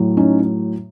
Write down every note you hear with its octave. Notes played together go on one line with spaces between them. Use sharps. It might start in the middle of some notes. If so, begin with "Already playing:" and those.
Already playing: A2 F#3
C#4 D#4